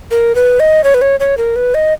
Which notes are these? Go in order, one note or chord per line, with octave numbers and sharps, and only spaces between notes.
A#4
B4
D#5
C#5
B4
C#5
C#5
A#4
B4
D#5